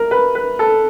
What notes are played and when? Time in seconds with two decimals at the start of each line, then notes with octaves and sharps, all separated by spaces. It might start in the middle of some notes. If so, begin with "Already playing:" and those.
Already playing: A#4
0.11 B4
0.35 B4
0.59 A4